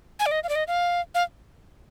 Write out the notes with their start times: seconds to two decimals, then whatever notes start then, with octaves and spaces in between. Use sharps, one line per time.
0.19 G#5
0.26 D5
0.31 D#5
0.44 F5
0.49 D5
0.55 D#5
0.68 F5
1.15 F5